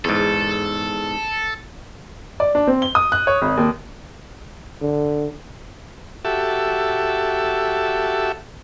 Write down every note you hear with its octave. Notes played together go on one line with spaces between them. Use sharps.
E2 G#2 A4
D5
D4
C4
G7
D#6
F#6
C#5
G#1
D#2
D3
F#4 G4 A4 E5